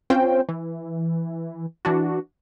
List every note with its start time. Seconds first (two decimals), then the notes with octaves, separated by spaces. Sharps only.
0.10 C4 C#4 F4 C5 G5
0.49 E3
1.85 E3 D4 F#4